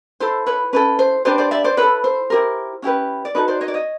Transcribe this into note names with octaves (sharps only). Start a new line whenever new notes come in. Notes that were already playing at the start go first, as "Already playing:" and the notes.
E4 A4 C5
B4 C#5
C#4 E4 A4 B4
C5
D4 G4 B4 C5 D5
C5 D5
D5 E5
C5 D5
E4 A4 B4 C#5
C5
E4 G4 A#4
C#4 E4 G4 B4
D5
D#4 F#4 A4 B4 C#5
C5 D5
C#5 D#5
D5
C#5 D#5